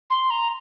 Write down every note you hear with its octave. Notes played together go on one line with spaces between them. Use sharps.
C6
A#5